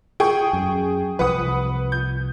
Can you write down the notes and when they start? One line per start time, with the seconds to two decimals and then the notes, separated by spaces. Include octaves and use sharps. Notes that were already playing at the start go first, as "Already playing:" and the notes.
0.20 G#4 G5 C#6
0.53 F#2
1.19 C2 F3 B4 F#5 D#6
1.92 G6